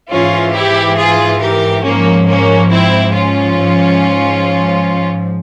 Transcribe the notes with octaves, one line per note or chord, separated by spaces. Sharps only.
G#2 E3 C#4 F4
E4 G4
F4 G#4
G4 A#4
G#2 F3 A#3 C#4
A#3 C#4
C4 E4
C#4 F4
G#2 F3